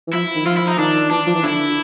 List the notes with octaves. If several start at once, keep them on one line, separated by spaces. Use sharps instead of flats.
E3
F3 E4
D#3
F3 F4
E4
D#4
D#3 D4
E3 D4
F3
E3
D3 E4